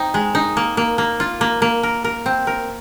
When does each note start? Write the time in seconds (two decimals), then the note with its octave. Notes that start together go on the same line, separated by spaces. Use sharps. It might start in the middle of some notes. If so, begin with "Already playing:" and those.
Already playing: C4 D#4
0.14 G#3
0.35 D#4
0.57 A#3
0.77 A#3
0.98 A#3
1.20 F4
1.41 A#3
1.62 A#3
1.83 A#4
2.04 A#4
2.26 C4
2.47 A#4